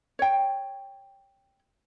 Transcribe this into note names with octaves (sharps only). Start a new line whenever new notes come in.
C#5 G5